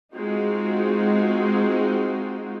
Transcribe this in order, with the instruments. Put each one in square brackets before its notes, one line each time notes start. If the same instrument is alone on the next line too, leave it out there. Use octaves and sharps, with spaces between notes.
[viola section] G#3 C4 D#4 F4 F#4